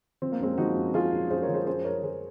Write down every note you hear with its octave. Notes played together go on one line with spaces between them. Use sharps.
F3 C4
A#3
F#2 G#3 C4
F3 D#4 F#4
F#2
F3 F4 G#4
F#2
F#2 G#4 C5
A#4 C#5
F3
G#4 C5
F#2 G#4 C5
F#2 A#4 C#5
F3 G#4 C5